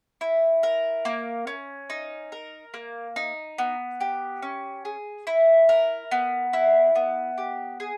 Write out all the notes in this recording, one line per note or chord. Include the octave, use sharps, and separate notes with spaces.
E4
A#4
A#3
C#4
D#4
A#4
A#3
D#4
B3
G4
C#4
G#4
E4
A#4
B3
E4
B3
G4
G#4